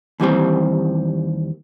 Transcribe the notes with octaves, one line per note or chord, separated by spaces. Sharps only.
D#2 E3 G3 C4